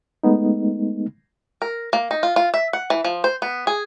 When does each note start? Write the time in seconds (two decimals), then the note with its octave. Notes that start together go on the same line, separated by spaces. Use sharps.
0.23 G#3 A3 B3 D#4
1.62 A#4
1.93 A#3
2.11 D#4
2.23 F4
2.36 F4
2.54 E5
2.73 F#5
2.90 E3
3.05 F3
3.24 C5
3.42 B3
3.67 G#4